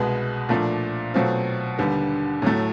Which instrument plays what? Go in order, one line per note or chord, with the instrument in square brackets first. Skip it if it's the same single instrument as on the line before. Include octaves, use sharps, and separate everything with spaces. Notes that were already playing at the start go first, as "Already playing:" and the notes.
Already playing: [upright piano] C2 B2 G#3 B3
A#2 F3 A3 D4
B2 F#3 A3 C4 F4
D#2 D3 G3 B3
A2 F#3 A3